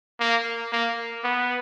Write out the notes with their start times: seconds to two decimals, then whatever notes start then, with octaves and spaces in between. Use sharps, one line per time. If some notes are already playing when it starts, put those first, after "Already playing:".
0.20 A#3
0.72 A#3
1.24 B3